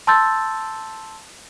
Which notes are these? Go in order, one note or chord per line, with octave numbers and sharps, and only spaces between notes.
A5 C6 E6 G6 A6